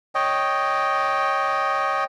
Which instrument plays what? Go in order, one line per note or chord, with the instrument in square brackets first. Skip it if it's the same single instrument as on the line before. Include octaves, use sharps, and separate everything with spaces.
[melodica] C#5 D#5 G5